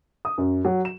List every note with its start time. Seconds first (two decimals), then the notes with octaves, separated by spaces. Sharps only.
0.25 D#6
0.38 F#2
0.65 F#3
0.85 E7